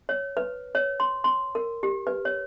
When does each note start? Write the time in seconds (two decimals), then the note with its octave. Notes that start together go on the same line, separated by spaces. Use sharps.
0.09 C#5
0.37 B4
0.75 C#5
1.00 C6
1.24 C6
1.55 A#4
1.83 G4
2.07 B4
2.25 C#5